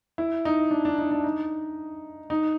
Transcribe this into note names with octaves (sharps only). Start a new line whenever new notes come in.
E4
D#4
D4
D4
D#4
D4
D#4
D#4